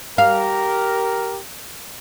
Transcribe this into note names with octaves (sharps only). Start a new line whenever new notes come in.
G4 A#4 F5